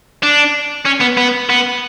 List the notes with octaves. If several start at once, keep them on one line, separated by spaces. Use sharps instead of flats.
D4
C#4
B3
B3
B3